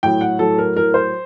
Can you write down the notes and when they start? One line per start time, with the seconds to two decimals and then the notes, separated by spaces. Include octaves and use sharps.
0.03 A2 F#3 G5
0.21 F#5
0.39 A2 F#3 A4
0.58 A#4
0.76 A2 F#3 A#4
0.94 C5